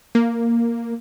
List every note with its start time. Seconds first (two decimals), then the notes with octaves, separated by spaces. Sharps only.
0.15 A#3